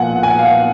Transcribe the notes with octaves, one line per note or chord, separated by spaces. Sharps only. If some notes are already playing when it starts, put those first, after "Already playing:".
Already playing: B1 A#2 F3 F#5 G#5
G#5
F#5
F5
F#5